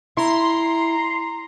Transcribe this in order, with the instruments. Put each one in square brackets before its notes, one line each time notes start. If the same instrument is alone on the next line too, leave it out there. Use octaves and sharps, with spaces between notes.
[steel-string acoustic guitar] E4 [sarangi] A#5 [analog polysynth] C6